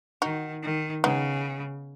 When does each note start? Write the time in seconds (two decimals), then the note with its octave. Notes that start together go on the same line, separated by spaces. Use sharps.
0.22 D#3 D#4 F#4
0.63 D#3
1.04 C#3 B3 D#4